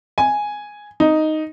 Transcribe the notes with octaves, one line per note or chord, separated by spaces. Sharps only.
G#5
D#4